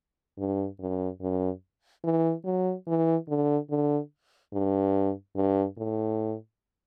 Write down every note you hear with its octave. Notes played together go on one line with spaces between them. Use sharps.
G2
F#2
F#2
E3
F#3
E3
D3
D3
G2
G2
A2